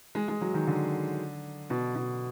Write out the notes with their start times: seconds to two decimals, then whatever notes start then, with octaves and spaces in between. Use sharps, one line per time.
0.15 G#3
0.28 G#3
0.41 F#3
0.54 D#3
0.67 D3
1.70 B2
1.95 B2